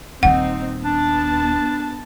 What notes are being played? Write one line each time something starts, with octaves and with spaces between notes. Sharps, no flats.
D#1 D#3 C4 D#4 F#5
B3 D4 A5